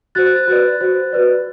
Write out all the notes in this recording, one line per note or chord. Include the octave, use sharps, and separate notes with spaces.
F#4 C5 F#6 A6
F#4 B4 D5
F#4 C5
F#4 B4 D5